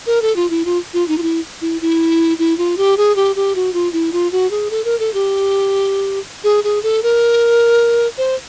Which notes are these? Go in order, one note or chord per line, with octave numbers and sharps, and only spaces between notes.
A#4
A4
F4
E4
F4
F4
D#4
F4
E4
E4
E4
E4
F4
G4
G#4
G4
G4
F#4
F4
E4
F4
F#4
G#4
A4
A#4
A4
G4
G#4
G#4
A4
A#4
C5